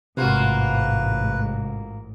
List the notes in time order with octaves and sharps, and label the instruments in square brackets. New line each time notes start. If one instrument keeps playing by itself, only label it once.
[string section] A1 G#2 [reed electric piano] C3 [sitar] A#3 F4 F#4 [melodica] B4